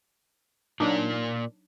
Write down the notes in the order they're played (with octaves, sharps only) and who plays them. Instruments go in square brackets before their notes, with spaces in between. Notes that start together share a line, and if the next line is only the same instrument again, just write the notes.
[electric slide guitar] A#2 A#4 D5 [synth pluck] F#3 D4 D#4